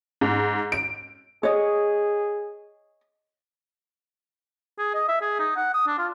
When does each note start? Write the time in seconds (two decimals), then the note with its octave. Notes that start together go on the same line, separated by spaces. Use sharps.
0.21 G#2
0.72 D7
1.43 G#4 C#5 D#5
4.78 G#4
4.94 D#5
5.08 E5
5.21 G#4
5.39 D#4
5.56 F#5
5.74 D#6
5.87 D4
5.99 F4